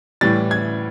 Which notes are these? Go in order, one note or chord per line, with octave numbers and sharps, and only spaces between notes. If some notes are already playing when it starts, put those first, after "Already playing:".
A2 E3 G3 A6
G#6